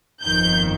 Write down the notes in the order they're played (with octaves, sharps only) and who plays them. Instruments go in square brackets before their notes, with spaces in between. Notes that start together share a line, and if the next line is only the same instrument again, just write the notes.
[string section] G1 F2 D#3 G6